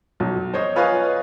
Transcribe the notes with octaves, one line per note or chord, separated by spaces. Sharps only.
B1
C5 C#5 D#5
F4 B4 C#5 D#5 F5 G#5